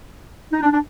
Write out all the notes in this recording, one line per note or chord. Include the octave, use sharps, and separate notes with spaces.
D#4
D4
D4